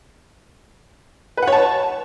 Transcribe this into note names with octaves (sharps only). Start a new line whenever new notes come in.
B4
F#5
C#5
A5